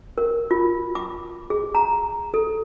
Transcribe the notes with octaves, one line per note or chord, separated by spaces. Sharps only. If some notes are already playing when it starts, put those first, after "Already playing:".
A#4
F4
D6
G#4
A#5
A4